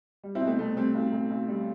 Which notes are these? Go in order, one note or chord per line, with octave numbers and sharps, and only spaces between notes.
G3
C4 E4
B2
A3 C4
C2 A3
G3 A3 C4
B1
B1
B1
G3